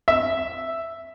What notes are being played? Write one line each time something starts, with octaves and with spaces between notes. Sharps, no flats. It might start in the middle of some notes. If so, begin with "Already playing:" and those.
E5